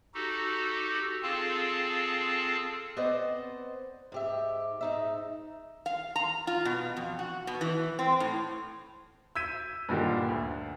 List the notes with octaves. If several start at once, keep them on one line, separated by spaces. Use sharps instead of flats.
D#4 F#4 G4 A4
C4 F4 G#4 A4 F5 A5
B3 C4 C5 D5 D#5
G#2 G4 E5
G#2 D#4 E5
F5
A#5
F4
B2
F2
F#4
B2
E3
C4
A2
E6 G6 G#6 B6 D#7
G2 A#2 D3 D#3 G4
D2